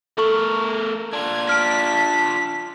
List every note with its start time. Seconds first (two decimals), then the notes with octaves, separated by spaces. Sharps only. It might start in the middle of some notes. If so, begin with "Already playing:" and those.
0.18 A3 A4 A#4 C#6 F#7
1.13 D4 F4 G#6
1.49 A5 F6 B6 D7